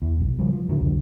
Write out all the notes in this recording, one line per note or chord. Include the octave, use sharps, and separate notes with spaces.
E2
F1 B1
C#3 F3 G3
F3
A2 D3 F#3
C2 F2 D3